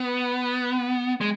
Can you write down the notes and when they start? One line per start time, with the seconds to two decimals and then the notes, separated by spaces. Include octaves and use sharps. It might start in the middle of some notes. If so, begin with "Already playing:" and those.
Already playing: B3
1.21 G#3